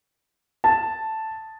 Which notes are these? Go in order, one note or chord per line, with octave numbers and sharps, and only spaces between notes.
A5